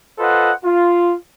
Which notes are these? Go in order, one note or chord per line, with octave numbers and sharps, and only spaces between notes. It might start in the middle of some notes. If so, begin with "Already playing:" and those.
F4 A4 B4 C5 D#5 F#5
F4